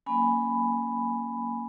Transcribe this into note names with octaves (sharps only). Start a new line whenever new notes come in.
F#3 A#3 C#4 G#5 B5